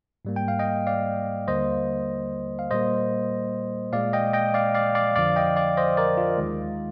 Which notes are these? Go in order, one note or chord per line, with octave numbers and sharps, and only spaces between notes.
G#2 G3 A#3
G5
F5
D#5 G5
D5 F5
D#2 D3 G3 A#3 C5 D#5
F5
A#2 G3 A#3 C5 D#5
A#2 G#3 D5 F5
D#5 G5
D#5 G5
D5 F5
D5 F5
D5 F5
F2 D3 F3 D5 F5
D#5 G5
D5 F5
C5 D#5
A#4 D5
F4
D#2 D#3 G#3